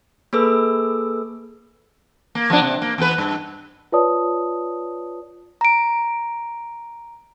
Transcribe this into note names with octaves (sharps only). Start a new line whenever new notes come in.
A#3 G#4 A4 B4 E6
A#3
F3 B3 D4
C3
A#3
E2 B3 B4
G2
F4 B4 C#5 D5 A5 D#6
A#5 D7